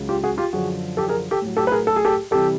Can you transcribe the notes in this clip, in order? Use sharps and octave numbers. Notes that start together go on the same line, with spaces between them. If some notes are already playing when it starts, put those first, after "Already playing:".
Already playing: C#2 C#3 F#3
F4 G4
F#4 G#4
F4 G4
F#2 D3 F3 F#4 G#4
G4 A4
G#4 A#4
G4 A4
A2 F#3
G4 A4
B4
G#4 A#4
A4
G#4
G4 A4
C3 E3 G3 G4 A4